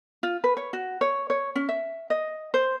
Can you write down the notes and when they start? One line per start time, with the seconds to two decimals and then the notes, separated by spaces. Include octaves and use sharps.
0.23 F4
0.44 B4
0.57 C#5
0.73 F#4
1.01 C#5
1.30 C#5
1.55 C#4
1.69 E5
2.10 D#5
2.54 C5